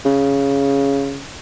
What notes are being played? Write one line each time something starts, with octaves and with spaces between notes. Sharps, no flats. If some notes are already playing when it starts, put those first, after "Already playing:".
C#3